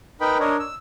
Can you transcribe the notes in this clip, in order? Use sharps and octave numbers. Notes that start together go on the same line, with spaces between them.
D#4 A#4 B4 D#5 G5 B5
D4 A#4 C#5 D#5
E6